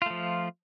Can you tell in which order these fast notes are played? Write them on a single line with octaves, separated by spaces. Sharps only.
F4 A3 F3